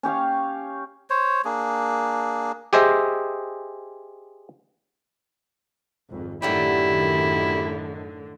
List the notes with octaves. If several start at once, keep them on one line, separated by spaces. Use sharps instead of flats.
C#4 G4 C#5 F5
C5 C#5
A#3 D4 G#4
G4 G#4 C5 D#5 E5
G#1 F2
F#2 A2 D3 D#3 F#3 G3 E4 G4